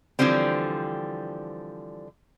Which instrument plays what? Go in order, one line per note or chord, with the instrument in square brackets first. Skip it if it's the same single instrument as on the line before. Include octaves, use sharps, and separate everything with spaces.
[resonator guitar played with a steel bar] D3 E3 F3 G3 C4